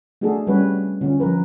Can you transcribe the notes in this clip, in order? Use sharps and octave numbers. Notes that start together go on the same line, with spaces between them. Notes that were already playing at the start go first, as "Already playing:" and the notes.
A3 D4 F#4 G#4 A4
G3 C#4 F#4 B4 C#5
D3 C#4 F4
F3 A#4 B4